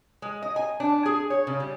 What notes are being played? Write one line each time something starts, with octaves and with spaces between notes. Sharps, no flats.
G#3
D#5
G#5
D4
G#4
C#5
C#3
G3